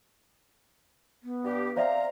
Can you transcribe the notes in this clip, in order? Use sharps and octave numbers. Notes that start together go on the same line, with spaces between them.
B3
G2 G4
C4 C5 D5 E5 F5 A#5